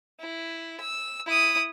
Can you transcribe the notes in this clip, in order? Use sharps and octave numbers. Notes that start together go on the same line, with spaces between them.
E4
E6
E4 D#6